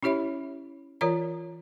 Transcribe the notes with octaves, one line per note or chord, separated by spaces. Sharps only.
C#4 E4 G4 C#5 E5 B5
E3 F4 A#4 C#5 A#5